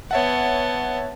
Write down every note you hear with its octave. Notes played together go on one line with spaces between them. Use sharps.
B3 C#5 E5 F#5 A5